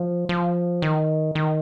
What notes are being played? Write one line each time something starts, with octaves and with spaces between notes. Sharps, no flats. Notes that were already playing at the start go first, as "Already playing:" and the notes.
Already playing: F3
F3
D#3
D#3